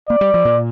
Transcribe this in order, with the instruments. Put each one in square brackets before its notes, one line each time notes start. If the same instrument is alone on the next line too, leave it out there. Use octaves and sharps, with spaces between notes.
[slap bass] A#3 [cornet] D5
[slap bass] G3
F3
A#2